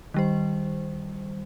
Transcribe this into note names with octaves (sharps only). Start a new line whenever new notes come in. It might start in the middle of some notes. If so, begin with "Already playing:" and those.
D#3 G3 C5